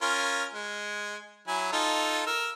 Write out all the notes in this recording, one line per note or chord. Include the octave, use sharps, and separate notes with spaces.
C#4 F4 A#4
G#3
F#3 E4 G#5
D#4 F4 A4
A#4 E6